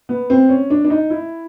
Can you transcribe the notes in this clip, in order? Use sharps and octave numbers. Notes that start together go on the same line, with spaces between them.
B3
C4
C#4
D4
D4
D#4
E4